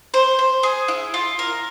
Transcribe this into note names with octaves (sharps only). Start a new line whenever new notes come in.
C5
C5
G#4
E4
F4
A#4